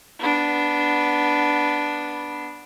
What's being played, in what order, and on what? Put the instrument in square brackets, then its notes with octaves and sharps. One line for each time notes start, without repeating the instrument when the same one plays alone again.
[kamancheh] B3 D4